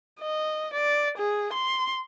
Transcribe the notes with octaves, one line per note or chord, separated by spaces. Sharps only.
D#5
D5
G#4
C6